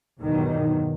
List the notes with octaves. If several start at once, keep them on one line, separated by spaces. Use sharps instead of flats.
E2 G2 B2 D#3 F#3